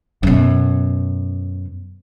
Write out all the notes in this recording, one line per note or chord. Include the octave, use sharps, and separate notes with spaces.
F#2 B2